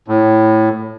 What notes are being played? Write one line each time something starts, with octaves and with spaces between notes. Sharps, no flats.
A2